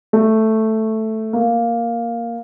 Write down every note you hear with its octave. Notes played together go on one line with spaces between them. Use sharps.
A3
A#3